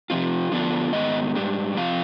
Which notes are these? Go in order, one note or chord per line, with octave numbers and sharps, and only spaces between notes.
C3 F3 C4 F4
D3 F3 B3 D4 F4
G#2 D#3 B3 D#4 D#5
G#2 G3 D4
C3 F3 C4 F4 F5